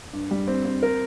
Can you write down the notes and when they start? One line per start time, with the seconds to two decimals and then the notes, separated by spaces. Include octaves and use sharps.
0.13 G2
0.31 G3
0.48 C4
0.65 C4
0.82 A#4